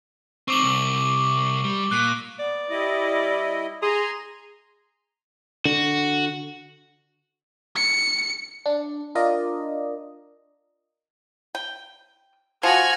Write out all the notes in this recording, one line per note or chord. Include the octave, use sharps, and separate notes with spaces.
C4 D#4 C#6 D6 F#7
C2
G3
A#2 F#6
B3 D5
G3 E4 D#5
G#4 G#5 A#5 C6
D3 F#4
C#7
D4
D4 F4 A#4 D5 D#5
G5
F3 F#4 F#5 G#5 F6 G#6 A#6